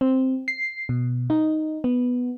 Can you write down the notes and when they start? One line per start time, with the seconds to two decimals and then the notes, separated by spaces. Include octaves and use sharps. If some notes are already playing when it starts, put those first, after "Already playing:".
0.01 C4
0.48 C7
0.89 B2
1.30 D#4
1.84 B3